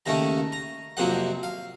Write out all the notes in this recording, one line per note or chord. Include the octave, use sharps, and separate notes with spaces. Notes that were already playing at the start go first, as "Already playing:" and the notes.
D#2 C#3 A3 C#4 A#5
A#5
F2 C3 F#3 A#3 F#5
F5